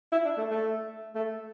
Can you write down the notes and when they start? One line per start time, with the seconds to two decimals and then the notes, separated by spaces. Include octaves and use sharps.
0.12 E4
0.25 D4
0.38 A3
0.51 A3
1.15 A3